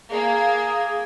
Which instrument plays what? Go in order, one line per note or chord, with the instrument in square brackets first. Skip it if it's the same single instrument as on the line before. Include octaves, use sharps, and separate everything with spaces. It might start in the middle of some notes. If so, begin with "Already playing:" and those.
[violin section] A#3 [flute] G#4